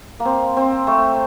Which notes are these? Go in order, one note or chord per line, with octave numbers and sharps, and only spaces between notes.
A#3
C4
C4
A3